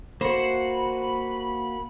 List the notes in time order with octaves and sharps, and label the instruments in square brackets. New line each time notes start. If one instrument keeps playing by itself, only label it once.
[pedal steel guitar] A#3 F#4 [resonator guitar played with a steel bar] C5 [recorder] B5